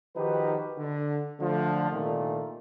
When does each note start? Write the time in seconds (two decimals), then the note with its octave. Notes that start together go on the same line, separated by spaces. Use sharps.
0.16 D#3 F3 D#4 F#4 G4 B4
0.78 D3
1.40 D3 F3 A3
1.92 C2 A#2 D#3 A3 F4